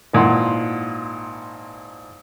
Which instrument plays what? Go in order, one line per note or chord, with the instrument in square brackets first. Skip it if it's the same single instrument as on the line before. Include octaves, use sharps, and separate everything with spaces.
[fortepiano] G#1 A#2 E3 F#5 C6